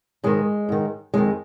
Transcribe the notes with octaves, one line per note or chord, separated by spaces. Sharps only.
G#2 D#3 G#3
G#2 D#3
F2 D#3 G#3